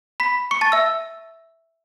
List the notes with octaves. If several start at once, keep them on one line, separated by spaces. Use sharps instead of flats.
B5 B6
C#6 C#7
A5 A6
E5 E6